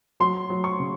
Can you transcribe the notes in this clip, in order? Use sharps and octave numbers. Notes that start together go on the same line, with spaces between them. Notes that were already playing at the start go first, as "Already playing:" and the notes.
F#3 C6
F#3
C#6
C#3